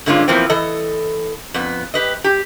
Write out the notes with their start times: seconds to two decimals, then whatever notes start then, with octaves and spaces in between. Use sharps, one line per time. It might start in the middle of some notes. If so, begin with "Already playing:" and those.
0.06 G2 D3 G#3 A#3 C#4 F4
0.28 E2 E3 F3 A#3 C4
0.49 E3 A4 D#5
1.54 F2 B3
1.94 G4 B4 D#5
2.24 G4